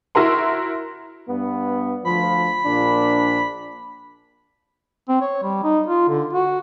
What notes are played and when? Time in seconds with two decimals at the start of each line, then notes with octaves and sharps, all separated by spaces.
0.15 E4 F#4 A#4 C6
1.28 G2 B3
2.05 D2 F3 B5
2.65 A#1 A#2 D4
5.09 C4
5.21 C#5
5.43 G3
5.64 D#4
5.87 F4
6.08 D3
6.33 F#4